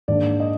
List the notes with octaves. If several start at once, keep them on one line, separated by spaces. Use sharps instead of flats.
G#2 D#3 A#3 D4 D5
D#5